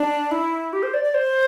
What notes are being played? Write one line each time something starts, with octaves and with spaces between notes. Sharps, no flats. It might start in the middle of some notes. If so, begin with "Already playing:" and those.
Already playing: D4
E4
G4
C5
D5
D5
C5